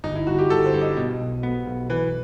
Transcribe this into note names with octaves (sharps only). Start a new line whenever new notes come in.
G1 D#4
E4
G1 F#4
G4
G1 A4
C5
G2
D#5
B2
B1
B3
B1
E3 B4